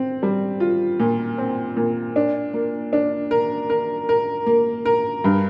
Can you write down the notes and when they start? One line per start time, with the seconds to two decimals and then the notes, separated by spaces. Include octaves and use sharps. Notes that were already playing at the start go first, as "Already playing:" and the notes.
Already playing: C4
0.23 G3
0.60 F4
1.00 A#2
1.38 C4
1.77 A#2
2.16 D4
2.53 A#3
2.93 D4
3.31 A#4
3.70 A#4
4.09 A#4
4.46 A#3
4.85 A#4
5.24 G2